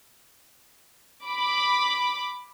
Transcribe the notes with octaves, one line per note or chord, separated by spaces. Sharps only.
B5 D6